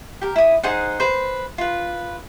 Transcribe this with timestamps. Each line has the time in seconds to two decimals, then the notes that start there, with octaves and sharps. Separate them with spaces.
0.21 G4 A#4
0.36 E4 D#6
0.63 D#4 G#4 C5 F#5
1.00 B4 C5
1.58 F4 B4